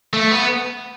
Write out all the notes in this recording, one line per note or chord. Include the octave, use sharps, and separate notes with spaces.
A3
B3